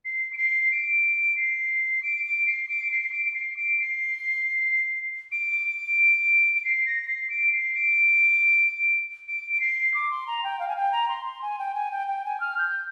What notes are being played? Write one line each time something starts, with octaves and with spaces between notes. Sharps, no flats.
C7
D7
C7
D7
C7
D7
D7
C7
D7
C7
C7
D7
D7
C7
D7
C7
D7
D7
C7
A#6
A#6
C7
D7
C7
D7
D7
D7
C7
D6
C6
A#5
G5
F5
G#5
G5
A#5
C6
C6
G#5
G5
G#5
G5
G5
G#5
F6
G6